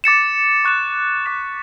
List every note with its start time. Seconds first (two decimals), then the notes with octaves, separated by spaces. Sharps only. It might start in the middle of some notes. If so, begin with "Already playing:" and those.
0.04 D6 A6 C#7 E7
0.65 C#6 F#6 C#7 E7
1.26 D6 F#6 B6 E7